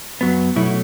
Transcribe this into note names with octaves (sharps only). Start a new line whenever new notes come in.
F#2 F#3 B3
B2 F#3 A3 E4